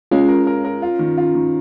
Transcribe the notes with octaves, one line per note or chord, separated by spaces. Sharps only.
G#3 C#4 F4
A#4
A#4
A#4
F4
D#3
F4
D#3